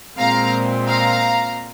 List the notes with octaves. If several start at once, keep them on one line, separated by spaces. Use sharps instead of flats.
A#2 G#3 C4 F5 A#5
F5 A#5